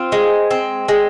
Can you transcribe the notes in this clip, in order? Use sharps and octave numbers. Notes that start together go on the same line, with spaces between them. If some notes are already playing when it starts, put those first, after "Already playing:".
Already playing: C4 F4
G#3
C4
G#3